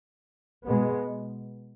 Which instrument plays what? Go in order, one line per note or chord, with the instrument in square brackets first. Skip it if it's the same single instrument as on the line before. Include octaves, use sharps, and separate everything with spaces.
[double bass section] B2 G#3 B3